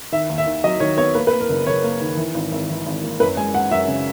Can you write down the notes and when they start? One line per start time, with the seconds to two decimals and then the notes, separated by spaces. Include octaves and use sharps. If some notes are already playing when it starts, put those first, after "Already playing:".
0.12 D#3 E5
0.30 D#2
0.38 E5
0.46 D#3
0.64 F#3 D#5
0.80 D#3 C#5
0.97 B3 C#5
1.15 A#3 B4
1.27 B4
1.32 A#3
1.41 A#4
1.49 F#1
1.66 F#1 C#5
1.83 A#3
2.01 D#3
2.17 E3
2.34 G#1
2.52 G#1
2.69 E3
2.86 G#1
3.03 A#3
3.20 F#2 B4
3.37 G#3 G#5
3.54 G#3 F#5
3.71 F#2 E5
3.88 C#3